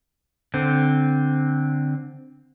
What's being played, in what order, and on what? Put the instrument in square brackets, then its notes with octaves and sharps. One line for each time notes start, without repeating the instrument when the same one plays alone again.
[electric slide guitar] D3 C4